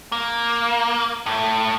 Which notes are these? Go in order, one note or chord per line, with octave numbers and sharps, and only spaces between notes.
A#3
A2